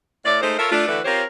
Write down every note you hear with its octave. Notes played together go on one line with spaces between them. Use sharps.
A2 D5
G#3 A3 D#4 C5
F4 A4 A#4 C#5 E5
A3 D4 F4
D3 E3 A3 F#4 B4 D5
C4 F4 G4 A#4 C5 C#5